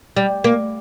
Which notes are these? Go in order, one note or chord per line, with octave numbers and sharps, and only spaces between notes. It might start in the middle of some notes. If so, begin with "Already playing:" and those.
G3
A#3